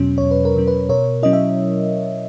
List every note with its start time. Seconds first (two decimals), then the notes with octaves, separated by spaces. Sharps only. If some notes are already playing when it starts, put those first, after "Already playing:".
Already playing: E2 B2 F#3 C#4
0.18 E2 C#5
0.31 B4
0.45 A#4
0.56 B2 F#3 C#4
0.68 B4
0.89 B2 A#4 C#5
1.23 F#3 C#4 E4 D#5
1.33 E5